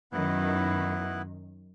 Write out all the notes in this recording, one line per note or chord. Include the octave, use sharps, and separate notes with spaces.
F#2 D#3 B3 E4 B4